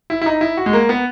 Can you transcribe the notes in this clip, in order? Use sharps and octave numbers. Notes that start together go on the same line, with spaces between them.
E4
E4
D#4
E4
F#4
G#3
A#3
B3